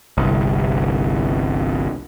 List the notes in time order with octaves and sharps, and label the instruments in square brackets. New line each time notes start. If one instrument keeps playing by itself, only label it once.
[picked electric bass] G1 C2